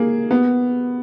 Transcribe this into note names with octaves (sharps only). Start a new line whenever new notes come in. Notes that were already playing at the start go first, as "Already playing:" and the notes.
Already playing: A#3 G#4
B3